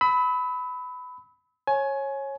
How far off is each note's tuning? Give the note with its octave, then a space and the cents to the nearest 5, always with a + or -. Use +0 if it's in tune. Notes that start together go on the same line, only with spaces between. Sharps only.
B5 +15 E6 -40
C#5 -20 G#5 +20